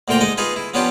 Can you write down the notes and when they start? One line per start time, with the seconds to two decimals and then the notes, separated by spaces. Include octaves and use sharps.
0.08 D2 A#2 D3 F4 G5 A#5
0.21 G#3 D#4 D#5
0.38 D#4 F4 G#4 B4
0.56 E4
0.74 F3 B3 C#4 D4 F4 G4